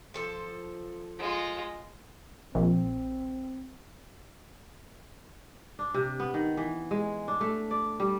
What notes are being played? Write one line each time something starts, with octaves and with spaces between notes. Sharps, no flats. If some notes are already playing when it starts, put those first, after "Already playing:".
F3 A4 C5
G#3 F4
A#1 C4
D4
C3
B3
D#3
E3
G#3
D4
A3
D5
G3